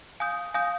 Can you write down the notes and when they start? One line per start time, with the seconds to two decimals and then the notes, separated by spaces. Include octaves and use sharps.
0.20 F5 G#5 D#6 G6
0.54 F5 G#5 D#6 G6